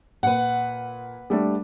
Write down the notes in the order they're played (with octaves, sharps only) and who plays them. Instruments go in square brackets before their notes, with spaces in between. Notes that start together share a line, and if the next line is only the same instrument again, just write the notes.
[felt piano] A#2 [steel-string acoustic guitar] B4 F#5
[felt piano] G3 A3 D4